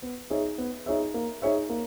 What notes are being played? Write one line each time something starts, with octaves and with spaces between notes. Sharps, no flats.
B3
D#4 G#4 C#5 E5
B3
D#4 G#4 C#5 E5
A#3
D#4 G#4 C#5 E5
A#3